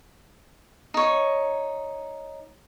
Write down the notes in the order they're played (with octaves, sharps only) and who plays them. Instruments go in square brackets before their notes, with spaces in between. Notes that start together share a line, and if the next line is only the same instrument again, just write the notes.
[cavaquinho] D#4 C#5